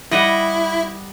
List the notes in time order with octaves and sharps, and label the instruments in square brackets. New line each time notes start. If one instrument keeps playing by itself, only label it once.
[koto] G3 D#5 F#5 [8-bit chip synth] E4